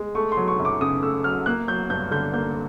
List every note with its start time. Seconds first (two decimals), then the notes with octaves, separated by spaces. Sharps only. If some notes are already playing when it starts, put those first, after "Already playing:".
Already playing: G#3
0.15 A3 C#6
0.32 C6
0.37 F#3
0.48 C#6
0.59 F#2
0.65 D6
0.81 C#3 D#6
1.02 A3 E6
1.24 F#3 F6
1.46 A#3 F#6
1.68 F#3 G6
1.90 G2 G6
2.11 D3 G6
2.34 A#3 G6